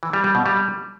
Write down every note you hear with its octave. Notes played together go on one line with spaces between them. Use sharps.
E3
G3
G3
B2
G3